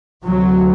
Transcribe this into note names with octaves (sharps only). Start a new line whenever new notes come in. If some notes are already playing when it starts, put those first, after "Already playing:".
D2 C3 F#3